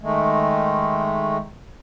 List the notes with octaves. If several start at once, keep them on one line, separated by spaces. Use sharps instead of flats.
D#3 G#3 A3